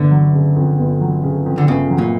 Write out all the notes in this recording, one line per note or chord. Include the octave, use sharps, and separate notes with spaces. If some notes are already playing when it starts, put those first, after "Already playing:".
Already playing: G1 D3
F#3
C#3
F2
G1
F#3
C#3
F2
D3
G1 C#3
F#3
A#2